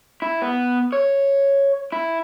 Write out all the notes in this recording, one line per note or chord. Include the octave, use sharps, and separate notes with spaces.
E4
B3
C#5
E4